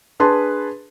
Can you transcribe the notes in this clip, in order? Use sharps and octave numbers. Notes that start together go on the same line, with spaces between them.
D4 G#4 B4 A5 C6